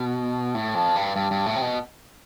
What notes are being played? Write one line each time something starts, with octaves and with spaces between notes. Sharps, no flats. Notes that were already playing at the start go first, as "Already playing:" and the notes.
Already playing: B2
A2
F2
G2
G2
G2
A2
C3
B2